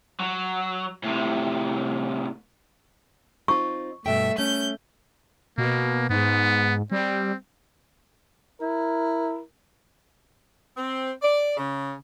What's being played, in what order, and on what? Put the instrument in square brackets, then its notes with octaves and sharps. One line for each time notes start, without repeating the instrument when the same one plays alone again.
[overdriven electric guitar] F#3
A2 C3
[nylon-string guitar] C4 D#4 F4 [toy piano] C#6
[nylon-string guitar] G2 B2 G5 [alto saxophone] A3 [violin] E5
[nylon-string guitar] A3 [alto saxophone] C#4 [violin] G6
[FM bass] B2 [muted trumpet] A#3
[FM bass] G#2 [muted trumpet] B3
[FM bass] G3 [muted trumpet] C4
[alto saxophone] E4 [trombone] A#4
[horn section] C4
D5
C#3